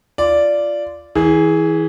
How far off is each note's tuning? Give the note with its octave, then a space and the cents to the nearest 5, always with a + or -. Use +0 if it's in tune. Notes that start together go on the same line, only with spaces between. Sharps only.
F4 -15 D5 -5
E3 -25 G#4 +0